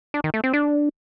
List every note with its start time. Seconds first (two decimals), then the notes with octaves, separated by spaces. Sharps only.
0.14 D4
0.24 D#3
0.34 A3
0.44 C4
0.53 D4